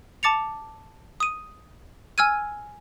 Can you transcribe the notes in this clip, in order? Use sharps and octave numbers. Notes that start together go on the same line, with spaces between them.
A5 D6 A6 C#7 F7
D#6 D#7
G#5 E6 F6 G#6 D#7